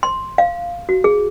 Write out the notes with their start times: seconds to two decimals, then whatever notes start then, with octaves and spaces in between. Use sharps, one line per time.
0.03 C6
0.38 F5
0.89 F#4
1.04 G#4